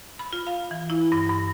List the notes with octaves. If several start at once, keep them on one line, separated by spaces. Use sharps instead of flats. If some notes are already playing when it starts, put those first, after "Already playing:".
B5
F4
F5
E3
E4
G2
G2